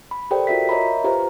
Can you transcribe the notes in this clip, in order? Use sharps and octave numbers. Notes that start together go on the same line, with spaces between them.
B5
G4 A4 A#4 C5 D5 G5
F4 F#4 A#4 E5 B6
A#4 C#5 D#5 E5 A#5 B5
F4 G4 B4 C5 F5 A#5